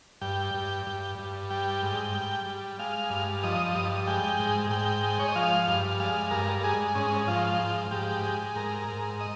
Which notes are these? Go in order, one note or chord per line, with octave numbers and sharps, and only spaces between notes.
G2 G5
G2
G2
G2
G3 G5
G#2
G3
G3
G#3 F5
G2
F3 D#5
G2
G#3 G5
G#2
G#2 G5
G#3
C#5
D#5
F3 F5
G2
G#3 F5
G2 A#4
G#3 G#4
G#2 C#4
C#4
F3 F4
G#2
G#2 G4
G#3
G#2 A#4
G#2
D#5